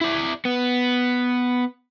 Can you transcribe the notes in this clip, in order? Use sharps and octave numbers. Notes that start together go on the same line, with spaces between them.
E4 D5
B3